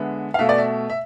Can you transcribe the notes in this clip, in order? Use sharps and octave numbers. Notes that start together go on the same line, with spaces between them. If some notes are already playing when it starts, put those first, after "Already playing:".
Already playing: D3 G#3 B3 E5
F5
B2 A3 E5
D5
E5
E5